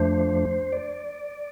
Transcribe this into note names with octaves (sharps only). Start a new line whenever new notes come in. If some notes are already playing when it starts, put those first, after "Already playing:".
Already playing: F2 F3 A3 D4 C5
D5